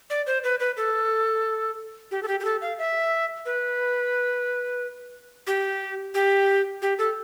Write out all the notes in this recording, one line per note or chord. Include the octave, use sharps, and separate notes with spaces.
D5
C5
B4
B4
A4
G4
A4
G4
G4
A4
F5
E5
B4
G4
G4
G4
A4